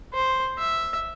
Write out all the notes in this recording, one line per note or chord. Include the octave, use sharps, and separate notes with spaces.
C5
E5